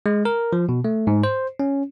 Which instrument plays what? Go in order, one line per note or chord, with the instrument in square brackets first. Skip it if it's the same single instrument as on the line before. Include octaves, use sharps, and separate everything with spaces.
[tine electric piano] G#3
A#4
F3
B2
A3
G#2
C5
C#4